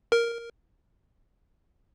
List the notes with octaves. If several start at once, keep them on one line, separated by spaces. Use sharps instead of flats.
A#4